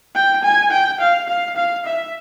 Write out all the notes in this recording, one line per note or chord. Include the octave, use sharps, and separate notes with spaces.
G5
G#5
G5
F5
F5
F5
E5